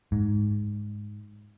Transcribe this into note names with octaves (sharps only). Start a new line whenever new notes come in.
G#2